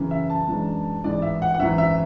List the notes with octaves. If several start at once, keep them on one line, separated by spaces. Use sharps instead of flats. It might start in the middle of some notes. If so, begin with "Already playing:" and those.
Already playing: F#2 C#3 E3
E5
A5
F#2 E3 G#3 D4
A1 G#2 E3 D5
E5
F#5
F#5
G#1 F#2 E3 E5
E5